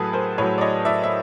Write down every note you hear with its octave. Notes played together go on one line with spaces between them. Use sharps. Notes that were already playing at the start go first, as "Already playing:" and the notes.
Already playing: A2 F#3 G#4 A4 B4
A#4 C5
A2 F#3 B4 C#5
D5
C#5 D#5
D5 E5
E5